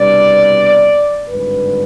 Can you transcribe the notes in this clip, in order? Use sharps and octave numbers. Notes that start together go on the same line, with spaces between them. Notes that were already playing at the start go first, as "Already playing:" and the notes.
Already playing: C2 B2 G3 B3 D4 D5
G#1 G2 D3 B4